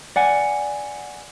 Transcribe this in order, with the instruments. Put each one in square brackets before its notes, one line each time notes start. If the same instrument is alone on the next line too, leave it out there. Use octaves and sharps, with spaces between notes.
[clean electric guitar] D5 F#5 G#5